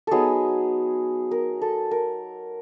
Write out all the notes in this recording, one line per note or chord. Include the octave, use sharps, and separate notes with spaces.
F#3 B3 D#4 G#4 A4
A#4
A4
A#4